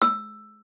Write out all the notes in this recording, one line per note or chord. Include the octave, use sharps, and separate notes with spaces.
E6